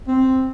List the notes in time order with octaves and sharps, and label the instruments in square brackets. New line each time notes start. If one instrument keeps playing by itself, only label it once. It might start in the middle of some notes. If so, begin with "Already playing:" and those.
[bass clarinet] C4